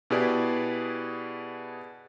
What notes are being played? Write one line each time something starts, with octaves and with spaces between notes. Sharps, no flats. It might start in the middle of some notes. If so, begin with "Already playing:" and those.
B2 E4 G4 G#4 B4 D5